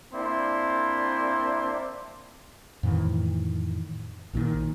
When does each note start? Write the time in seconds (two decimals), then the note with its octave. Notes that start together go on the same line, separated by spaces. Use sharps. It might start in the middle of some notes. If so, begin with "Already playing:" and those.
0.13 A#3 C4 D4 E4 D5 C6
2.83 F2 A2 D#3 E3
4.33 A#1 A#2 D3 D#3